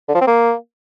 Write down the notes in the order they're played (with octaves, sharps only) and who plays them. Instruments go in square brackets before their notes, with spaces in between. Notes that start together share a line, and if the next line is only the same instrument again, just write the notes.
[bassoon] D3
F3
C4
A#3